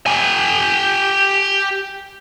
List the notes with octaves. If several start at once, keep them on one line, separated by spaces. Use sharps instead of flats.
G4 G#5